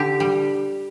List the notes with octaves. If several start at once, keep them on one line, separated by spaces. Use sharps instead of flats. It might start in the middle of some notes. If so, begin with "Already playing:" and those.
Already playing: D3 G4
G3